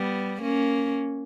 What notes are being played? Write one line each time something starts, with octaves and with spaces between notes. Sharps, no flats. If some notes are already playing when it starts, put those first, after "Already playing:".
Already playing: G3 B3
A#3 C#4